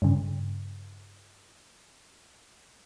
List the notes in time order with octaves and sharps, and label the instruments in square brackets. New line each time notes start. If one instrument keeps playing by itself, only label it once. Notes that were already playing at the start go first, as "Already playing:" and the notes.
[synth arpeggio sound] G2 C#3